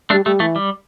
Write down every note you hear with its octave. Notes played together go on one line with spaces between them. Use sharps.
G3 A3 D4
G3 A3
E3 A3
G3